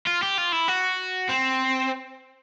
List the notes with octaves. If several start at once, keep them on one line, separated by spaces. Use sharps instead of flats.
F4
G4
F4
E4
F#4
C4